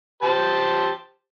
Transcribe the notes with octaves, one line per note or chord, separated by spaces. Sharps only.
G4 C5 A5